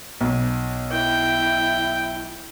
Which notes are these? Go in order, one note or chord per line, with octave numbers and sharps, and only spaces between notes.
B1
E4 G5